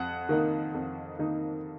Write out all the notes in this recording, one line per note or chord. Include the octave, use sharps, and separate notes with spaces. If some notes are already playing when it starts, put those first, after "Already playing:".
Already playing: F2 F#5
D#3 A#3 D#4
F2
D#3 A#3 D#4